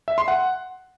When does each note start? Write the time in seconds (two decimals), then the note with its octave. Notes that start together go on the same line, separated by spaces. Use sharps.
0.08 E5
0.18 C6
0.28 F#5